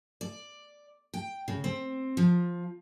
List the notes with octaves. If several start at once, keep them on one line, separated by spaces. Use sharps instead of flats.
D5
G5
C#3
C4
F3